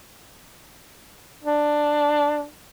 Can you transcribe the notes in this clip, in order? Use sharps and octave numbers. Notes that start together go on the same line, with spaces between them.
D4